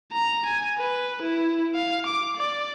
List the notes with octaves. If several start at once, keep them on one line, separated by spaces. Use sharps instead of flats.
A#5
G#5
B4
E4
F5
D6
D5